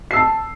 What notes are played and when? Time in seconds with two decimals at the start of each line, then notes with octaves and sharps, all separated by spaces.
0.11 C7
0.13 E6
0.16 A5